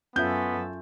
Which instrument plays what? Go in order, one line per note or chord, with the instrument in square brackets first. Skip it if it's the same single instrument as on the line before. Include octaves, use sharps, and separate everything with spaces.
[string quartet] F#2 A4 [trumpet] B3 [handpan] C#4 F4 E5 [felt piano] G6